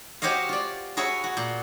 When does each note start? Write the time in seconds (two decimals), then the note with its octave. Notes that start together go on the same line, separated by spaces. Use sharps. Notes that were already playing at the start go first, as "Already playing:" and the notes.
0.22 F#4 G4 C5 C#5 D#5 F5
0.49 F4 D5
0.97 F#4 G#4 B4 C#5 E5
1.24 F#4
1.37 A#2